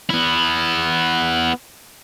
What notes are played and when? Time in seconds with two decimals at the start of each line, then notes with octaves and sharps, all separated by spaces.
0.09 B3 E4